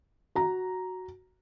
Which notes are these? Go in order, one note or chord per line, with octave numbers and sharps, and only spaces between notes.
F#4 A#5